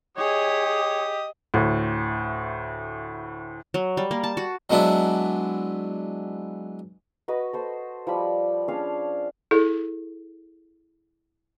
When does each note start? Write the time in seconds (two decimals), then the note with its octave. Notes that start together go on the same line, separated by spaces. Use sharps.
0.17 G4 G#4 C#5 D#5 D#6
1.54 D2 A2
3.74 F#3
3.97 G3
4.11 A#3
4.24 A5
4.37 F#4
4.70 F#3 G#3 B3 D4 E4
7.28 F#4 B4 D#5 B5
7.53 A4 C5 C6
8.07 F3 G3 B5
8.68 C#4 D4 G#4 F5
9.51 E4 G#4 A4